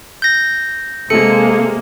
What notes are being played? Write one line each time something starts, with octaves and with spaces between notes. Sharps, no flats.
G6 A#6
C3 G#3 A#3 A4 C#7